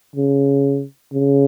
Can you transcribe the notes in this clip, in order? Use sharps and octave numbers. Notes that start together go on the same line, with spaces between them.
C#3
C#3